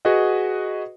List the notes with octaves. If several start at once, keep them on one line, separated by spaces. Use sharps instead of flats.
F#4 G#4 B4 D#5 F#5